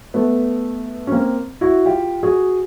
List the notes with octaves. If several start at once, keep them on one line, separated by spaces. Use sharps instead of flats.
A3 B3
C#4
A#3 C4
E4 F#4
F4 G4
F#4 G#4